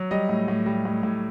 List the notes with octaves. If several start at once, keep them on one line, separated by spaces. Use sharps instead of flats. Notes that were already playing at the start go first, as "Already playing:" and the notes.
Already playing: F#3
G3 D#5
A2
A2
G3
A2
A2